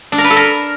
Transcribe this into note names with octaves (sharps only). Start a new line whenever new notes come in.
D4
A#4
B4
A4
A#4